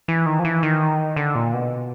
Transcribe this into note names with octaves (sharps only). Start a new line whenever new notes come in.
E3
D#3
F3
E3
D#3
D3
A#2
B2